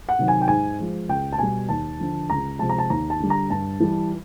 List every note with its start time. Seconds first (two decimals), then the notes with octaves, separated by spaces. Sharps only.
0.09 F#5
0.19 C3 D#3 F#3
0.28 G#5
0.41 G5
0.48 G#2 G#5
0.79 F3 G#3
1.09 C#2 G5
1.33 A5
1.38 B2 G3 G#5
1.69 D#2 A5
2.00 D3 F3
2.30 C#2 A#5
2.59 C3 F3 G#3 A5
2.69 A#5
2.78 A5
2.90 D#2 A#5
3.10 A5
3.20 D3 G3
3.30 A#5
3.50 G2 A5
3.80 E3 G3